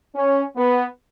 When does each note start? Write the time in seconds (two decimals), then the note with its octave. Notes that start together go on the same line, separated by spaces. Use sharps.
0.15 C#4
0.56 B3